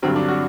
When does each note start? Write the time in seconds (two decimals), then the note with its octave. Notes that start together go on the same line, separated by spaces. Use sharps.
0.03 G2 D3 F#3 C4
0.16 D4
0.28 F#4